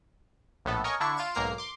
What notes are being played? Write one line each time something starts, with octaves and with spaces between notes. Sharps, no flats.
A#1 A2 B3 A4
A#4 C#5 D#5 G#5 C#6
D3 D4 E4 C#6
F4 F5 D7 E7
B1 G#2 A#3 A#4 A#5 C7
C6 D6